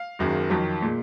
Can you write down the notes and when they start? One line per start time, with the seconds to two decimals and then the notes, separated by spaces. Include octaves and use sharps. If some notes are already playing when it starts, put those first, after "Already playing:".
Already playing: F5
0.19 F#1 F#2 D#3 G#3
0.50 F2 D#3 F#3
0.82 A#2 G#3